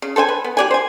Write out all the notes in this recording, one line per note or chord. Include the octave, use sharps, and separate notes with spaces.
C#3
A4 C5 G5 G#5
B4
B3
G4 D5 G#5
C5 G#5